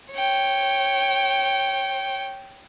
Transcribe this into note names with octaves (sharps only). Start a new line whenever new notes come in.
C#5 G5